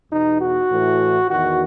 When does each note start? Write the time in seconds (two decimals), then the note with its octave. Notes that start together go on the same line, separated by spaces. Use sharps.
0.12 E2 B2 D#4
0.41 F#4
0.71 A2 E3
1.30 E2 D#3 F#4